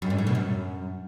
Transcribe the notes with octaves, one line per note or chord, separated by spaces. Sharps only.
F#2
G#2
A2
B2
F#2